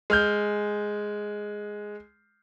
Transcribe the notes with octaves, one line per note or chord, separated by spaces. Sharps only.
G#3 F6 G6